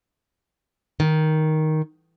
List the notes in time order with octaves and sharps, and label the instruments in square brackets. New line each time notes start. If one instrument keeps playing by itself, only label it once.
[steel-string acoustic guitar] D#3